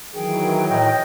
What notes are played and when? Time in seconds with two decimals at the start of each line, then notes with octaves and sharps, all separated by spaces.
0.14 D#3 E3 F#3 G#4 G5
0.70 A2 D#5 G5